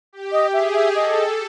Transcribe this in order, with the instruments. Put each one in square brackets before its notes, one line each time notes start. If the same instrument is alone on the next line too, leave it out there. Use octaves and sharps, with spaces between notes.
[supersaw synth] G4
[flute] D#5
[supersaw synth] G#4 [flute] E5
[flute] E5
[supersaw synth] A4 [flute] D#5